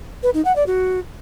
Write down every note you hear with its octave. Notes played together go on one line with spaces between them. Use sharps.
B4
D#4
F#5
D5
F#4